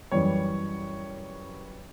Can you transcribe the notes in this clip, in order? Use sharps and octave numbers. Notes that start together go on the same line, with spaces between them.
F#2 E3 G3 C#5